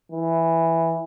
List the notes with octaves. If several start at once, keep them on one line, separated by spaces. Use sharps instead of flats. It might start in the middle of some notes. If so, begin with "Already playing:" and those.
E3